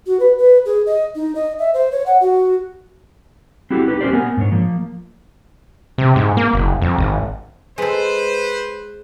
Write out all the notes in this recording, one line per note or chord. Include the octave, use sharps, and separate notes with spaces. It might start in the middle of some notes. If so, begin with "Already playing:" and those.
F#4
B4
B4
G#4
D#5
D#4
D#5
E5
C5
C#5
F#5
F#4
C4 E4 F#4 G4 A4
D#4 E4 G4 B4
C#4 G4 A#4 C5 D5
B3 A#4 G#5
G#2 D4 C#5
F3 A#3
C3
G#2
A#3
F#1
F2
G#1
G#3 A4 B4 C5